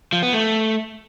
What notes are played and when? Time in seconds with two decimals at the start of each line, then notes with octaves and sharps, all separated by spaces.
0.13 F3
0.23 B3
0.33 A3